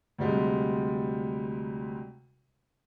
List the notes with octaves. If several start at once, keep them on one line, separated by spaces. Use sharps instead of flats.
D2 C3 G3 G#3